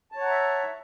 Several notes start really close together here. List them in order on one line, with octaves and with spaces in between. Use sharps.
A5 C#5 F#5 A#5 E5